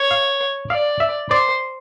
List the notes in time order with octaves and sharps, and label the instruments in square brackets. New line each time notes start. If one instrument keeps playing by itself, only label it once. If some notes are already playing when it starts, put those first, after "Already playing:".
Already playing: [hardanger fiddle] C#5
[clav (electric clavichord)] F5
[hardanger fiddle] D5 [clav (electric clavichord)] F5
[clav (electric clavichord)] E5
[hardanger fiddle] C5 [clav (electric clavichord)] D5